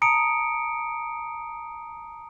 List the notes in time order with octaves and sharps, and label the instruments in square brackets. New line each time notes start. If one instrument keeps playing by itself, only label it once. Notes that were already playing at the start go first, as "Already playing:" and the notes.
[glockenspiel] A5 A#5 D#6 C#7 D7